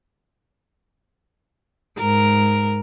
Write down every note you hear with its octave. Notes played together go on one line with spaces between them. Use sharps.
G#2 A#4